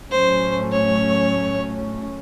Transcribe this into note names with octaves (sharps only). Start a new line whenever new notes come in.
A2 F#3 A3 C#4 C5
C#5